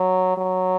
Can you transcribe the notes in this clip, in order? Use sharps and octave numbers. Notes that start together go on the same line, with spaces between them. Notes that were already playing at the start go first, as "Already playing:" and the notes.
Already playing: F#3
F#3